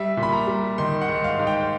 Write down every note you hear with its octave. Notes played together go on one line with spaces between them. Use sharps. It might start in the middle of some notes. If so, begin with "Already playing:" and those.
Already playing: G3 E5
A#2
B5
A#5
G3
D#3 C6
F#5
G#2
F5
G#2
G5